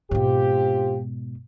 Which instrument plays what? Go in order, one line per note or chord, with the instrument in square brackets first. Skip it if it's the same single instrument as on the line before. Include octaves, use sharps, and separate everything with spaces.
[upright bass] G#2 B2 [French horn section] C4 F4 G4